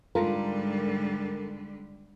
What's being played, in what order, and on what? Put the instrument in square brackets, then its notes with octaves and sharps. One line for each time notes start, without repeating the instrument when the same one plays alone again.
[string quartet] G#2 [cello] D3 G3 [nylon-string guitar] F4 [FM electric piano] A4 A#4